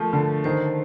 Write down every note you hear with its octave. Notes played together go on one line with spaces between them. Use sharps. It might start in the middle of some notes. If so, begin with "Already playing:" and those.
Already playing: F3 A3 A#4
D3
D#3 C5